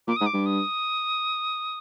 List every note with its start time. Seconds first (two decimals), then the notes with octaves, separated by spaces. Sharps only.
0.07 A#2 D6
0.16 D#6
0.21 G#2
0.26 D6
0.33 G2
0.46 D#6